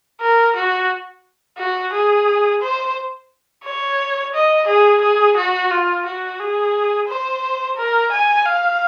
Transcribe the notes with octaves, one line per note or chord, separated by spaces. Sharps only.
A#4
F#4
F#4
G#4
C5
C#5
D#5
G#4
G#4
F#4
F4
F#4
G#4
C5
A#4
G#5
F5